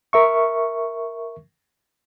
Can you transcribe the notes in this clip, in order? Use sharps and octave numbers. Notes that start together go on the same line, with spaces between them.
A#4 E5 C#6